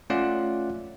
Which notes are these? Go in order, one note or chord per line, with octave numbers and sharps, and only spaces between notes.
A3 C#4 F4 D5 E5 F#5